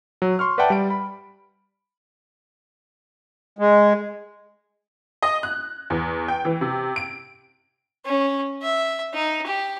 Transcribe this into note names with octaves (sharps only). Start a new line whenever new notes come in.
F#3
C6 C#6 F6
B4 D5 E5 F#5 G5 A5
G3 D7
B5
G#3
D#5
F#6
E2
G5
E3
C3
D7
C#4
E5
D#4
G4